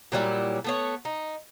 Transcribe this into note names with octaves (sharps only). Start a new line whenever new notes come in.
A#2 F#3 G3 E4
A3 B3 C#5
D#4